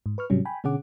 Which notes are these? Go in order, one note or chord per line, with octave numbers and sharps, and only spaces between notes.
G#2
B4 C#6 F6
G#2 C3 F#3 G3 C#4
G5 G#5 B5
B2 D3 C#4 G#4 F#5 D6